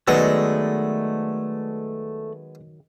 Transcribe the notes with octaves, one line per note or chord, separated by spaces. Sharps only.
D#3 F#3 G#3 A3 B3 D5 E6